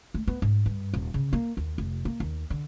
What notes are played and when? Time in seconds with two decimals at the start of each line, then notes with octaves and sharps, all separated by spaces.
0.14 A3
0.27 B3
0.42 G#2
0.66 G2
0.94 D#1
1.14 C#3
1.33 A#3
1.57 D#2
1.78 F1
2.05 A#3
2.20 D#2
2.50 D3